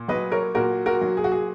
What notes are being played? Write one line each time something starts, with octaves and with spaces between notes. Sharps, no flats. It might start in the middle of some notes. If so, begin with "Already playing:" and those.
Already playing: A#2
F#3 B4 D#5
A#4 C#5
A#2 F#4 A#4
F#4 A#4
F#3
G#4
F#4
G#4